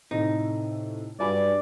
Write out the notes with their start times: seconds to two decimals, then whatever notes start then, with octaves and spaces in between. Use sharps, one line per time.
0.11 A2 C3 A3 D#4
1.20 G2 F#4 D5 G#5 B5